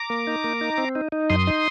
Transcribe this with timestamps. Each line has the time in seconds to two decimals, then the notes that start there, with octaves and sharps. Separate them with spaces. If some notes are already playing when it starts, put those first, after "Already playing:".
Already playing: A#5 D6
0.10 A#3
0.27 D#4
0.44 A#3
0.61 D#4
0.78 C4
0.95 D#4
1.12 D#4
1.30 F#2 C6 D#6
1.47 D#4